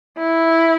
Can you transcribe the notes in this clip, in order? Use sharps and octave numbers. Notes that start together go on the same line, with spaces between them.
E4